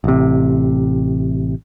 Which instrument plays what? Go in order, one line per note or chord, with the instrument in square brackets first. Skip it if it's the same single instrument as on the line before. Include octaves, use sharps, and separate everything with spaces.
[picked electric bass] A1 C3